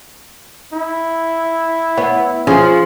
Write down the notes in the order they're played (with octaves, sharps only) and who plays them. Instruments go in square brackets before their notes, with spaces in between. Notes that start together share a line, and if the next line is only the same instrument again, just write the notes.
[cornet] E4
[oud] B3 [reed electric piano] C#5 F#5
[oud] F3 [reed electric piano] C#4 G#4